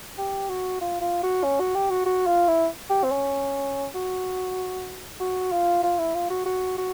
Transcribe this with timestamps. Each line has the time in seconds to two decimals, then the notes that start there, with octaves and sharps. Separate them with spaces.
0.18 G4
0.49 F#4
0.81 F4
1.01 F4
1.23 F#4
1.43 C#4
1.60 F#4
1.75 G4
1.90 F#4
2.06 F#4
2.26 F4
2.48 E4
2.90 G4
3.03 C4
3.11 C#4
3.94 F#4
5.20 F#4
5.52 F4
5.83 F4
5.98 E4
6.14 F4
6.30 F#4
6.46 F#4
6.78 F#4